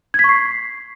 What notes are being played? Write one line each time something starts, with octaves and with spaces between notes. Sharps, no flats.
G#6
B6
C#6
C7